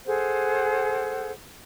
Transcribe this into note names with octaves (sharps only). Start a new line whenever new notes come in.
G#4 A4 C5 F#5